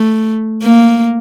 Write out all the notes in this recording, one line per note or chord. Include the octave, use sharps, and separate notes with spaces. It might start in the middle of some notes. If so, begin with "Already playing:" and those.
Already playing: A3
A#3